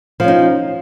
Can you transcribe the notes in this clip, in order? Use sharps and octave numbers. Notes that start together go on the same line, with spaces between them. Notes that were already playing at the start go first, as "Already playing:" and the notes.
F3 C#4 D#4